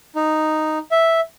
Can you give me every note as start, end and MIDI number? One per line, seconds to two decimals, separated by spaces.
0.16 0.78 63
0.91 1.20 76